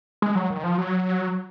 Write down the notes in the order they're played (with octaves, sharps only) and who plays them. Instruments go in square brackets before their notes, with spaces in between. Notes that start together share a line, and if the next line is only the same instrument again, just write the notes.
[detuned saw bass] G#3
F#3
D#3
F3
F#3